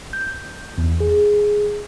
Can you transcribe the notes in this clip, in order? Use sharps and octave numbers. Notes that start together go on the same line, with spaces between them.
G6
E2
G#4